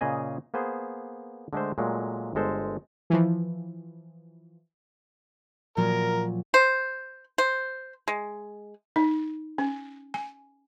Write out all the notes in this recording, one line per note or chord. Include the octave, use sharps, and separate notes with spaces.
A#2 C#3 G#4 D#5 G#5
A#3 B3 G#4 C5
D3 G#3 A3 C5
A#2 F#3 G#3 A3
G1 G#3 A4 C5
E3 F3
A#2 F3 F#3 A#4
C5
C5
G#3
D#4
C#4
G#5